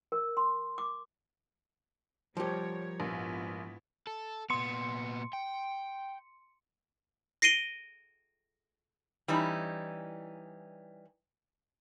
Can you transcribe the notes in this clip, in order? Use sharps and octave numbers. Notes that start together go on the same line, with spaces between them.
A#4
C6
D6
F3 G3 G4 A#4 C#5
A#1 G#2 B3 E4
A4
A#2 B3 C6 C#7
G5
A#6 C7 D7 D#7 G7
E3 G3 C#4 D#4